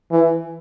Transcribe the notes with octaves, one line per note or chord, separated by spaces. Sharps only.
E3